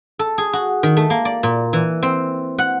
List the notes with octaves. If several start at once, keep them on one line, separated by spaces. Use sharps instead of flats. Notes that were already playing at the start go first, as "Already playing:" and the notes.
A4
G#4
F#4
D#3
A3
A#3
D5
A#2
E3
C4
F#5